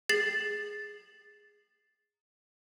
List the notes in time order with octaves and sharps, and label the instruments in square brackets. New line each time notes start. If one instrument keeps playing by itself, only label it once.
[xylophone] G#4 A6 C7 F#7